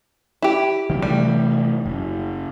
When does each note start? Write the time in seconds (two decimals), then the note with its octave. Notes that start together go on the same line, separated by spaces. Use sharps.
0.42 E4 G4
0.90 C2 D#3 F#3
1.02 C3 E3 G3 A3
1.86 F#1